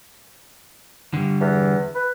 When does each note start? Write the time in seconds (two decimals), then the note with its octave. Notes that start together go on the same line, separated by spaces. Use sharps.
1.14 D3 G3
1.41 E2
1.95 B4